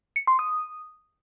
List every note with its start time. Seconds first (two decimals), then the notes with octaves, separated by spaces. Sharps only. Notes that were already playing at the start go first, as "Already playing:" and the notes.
0.16 C#7
0.27 C6
0.39 D#6